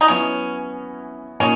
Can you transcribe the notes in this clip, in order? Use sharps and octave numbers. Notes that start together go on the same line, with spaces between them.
D#4
F#3 B3 C#4 E4
A#2 A#3 C#4 D#4